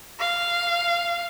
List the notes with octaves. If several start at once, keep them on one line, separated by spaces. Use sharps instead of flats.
F5